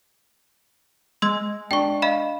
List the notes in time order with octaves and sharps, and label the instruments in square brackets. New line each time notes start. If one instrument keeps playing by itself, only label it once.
[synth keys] G#3 [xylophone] C6 E6 G#6
[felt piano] D4 [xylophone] G5 C#6
[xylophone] D#5 F5 B5